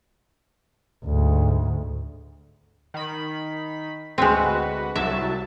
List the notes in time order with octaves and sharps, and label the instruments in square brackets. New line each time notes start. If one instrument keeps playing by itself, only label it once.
[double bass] D2 G#2
[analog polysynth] D#3 B5
[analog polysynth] D2 F#4 B4 [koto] G#3 C4
[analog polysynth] C2 F#3 A5 [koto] E5